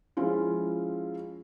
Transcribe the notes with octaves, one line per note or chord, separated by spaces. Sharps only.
F3 G#3 C#4 E4 F4